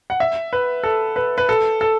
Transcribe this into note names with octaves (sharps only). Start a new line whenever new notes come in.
F#5
E5
B4
A4
B4
B4
A4
A4